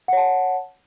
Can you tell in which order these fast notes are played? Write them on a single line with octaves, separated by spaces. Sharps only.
F#5 C#5 A5